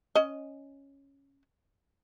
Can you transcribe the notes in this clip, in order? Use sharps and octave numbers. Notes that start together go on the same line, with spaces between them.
C#4 D#5